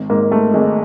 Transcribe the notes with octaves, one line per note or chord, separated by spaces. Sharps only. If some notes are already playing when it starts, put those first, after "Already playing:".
Already playing: G#1
G#2 A#3
G#2 A3
G#1 G#3